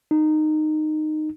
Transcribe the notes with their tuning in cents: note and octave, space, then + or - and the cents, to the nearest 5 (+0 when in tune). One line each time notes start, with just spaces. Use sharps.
D#4 -15